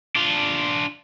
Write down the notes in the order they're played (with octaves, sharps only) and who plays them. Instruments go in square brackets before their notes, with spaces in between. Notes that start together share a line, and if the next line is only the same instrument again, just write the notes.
[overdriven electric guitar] D4 F4